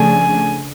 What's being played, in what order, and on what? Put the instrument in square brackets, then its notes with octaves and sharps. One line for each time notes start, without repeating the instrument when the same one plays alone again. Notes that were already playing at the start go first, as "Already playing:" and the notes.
Already playing: [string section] C#3 F3 A3 D4 G#4 [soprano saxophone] G#5